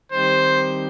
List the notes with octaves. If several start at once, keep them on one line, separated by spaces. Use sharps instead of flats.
D#3 G3 C4 D#4 G4 C5